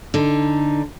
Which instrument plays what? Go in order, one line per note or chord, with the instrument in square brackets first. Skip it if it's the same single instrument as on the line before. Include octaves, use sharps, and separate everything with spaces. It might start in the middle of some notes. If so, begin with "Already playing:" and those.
[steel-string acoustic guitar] D3 D#4